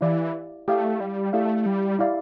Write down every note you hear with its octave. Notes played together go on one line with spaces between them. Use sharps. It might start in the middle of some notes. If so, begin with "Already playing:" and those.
E3 E4 G4 D5 F5
A3 E4 G4 D5 F5
G3
A3 E4 G4 D5 F5
G3
E4 G4 D5 F5